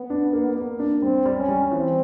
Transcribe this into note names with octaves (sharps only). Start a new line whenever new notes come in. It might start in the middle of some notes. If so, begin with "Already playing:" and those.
Already playing: B3
D4
A#3
A#3
D4
G3 C4
G3
C#4
G3
E3 C4